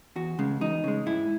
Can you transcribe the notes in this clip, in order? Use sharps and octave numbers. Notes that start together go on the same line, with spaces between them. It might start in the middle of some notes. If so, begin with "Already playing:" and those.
E2 F#4
C#3 G#3
E2 D#4
C#3 G#3
G#2 E4